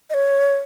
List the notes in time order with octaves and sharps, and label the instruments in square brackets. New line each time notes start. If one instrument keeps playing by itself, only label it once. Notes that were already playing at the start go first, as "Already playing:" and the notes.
[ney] D#5
C#5